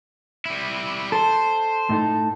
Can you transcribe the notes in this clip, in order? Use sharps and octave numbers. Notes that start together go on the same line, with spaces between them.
G3 E4
A4 C5
A2 D#4 A4